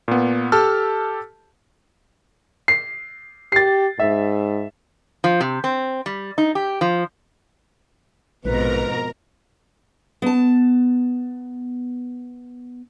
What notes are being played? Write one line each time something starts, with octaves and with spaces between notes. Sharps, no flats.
A#2 B3
G4 A4 A5 E6 F6
C7
G4 A6 C7
G#2 E5
F3
C3
C4
G3
D#4
G4
F3
A#1 F2 G#2 B2 A#4 B4 A#5
B3 A5